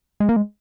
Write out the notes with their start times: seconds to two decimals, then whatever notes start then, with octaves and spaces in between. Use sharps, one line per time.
0.20 G#3
0.29 A#3
0.36 G#3